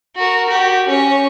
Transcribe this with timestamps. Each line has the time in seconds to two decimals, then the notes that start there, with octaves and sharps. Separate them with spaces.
0.16 F#4 A#4
0.48 F#4 G4
0.87 C#4 C#5